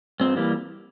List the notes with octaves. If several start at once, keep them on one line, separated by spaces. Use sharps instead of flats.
G2 C4
E3 G3 A#3